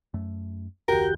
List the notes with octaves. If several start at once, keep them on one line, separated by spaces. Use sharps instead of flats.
F#2 A3
F#1 D#2 F#4 G4 A#4 G5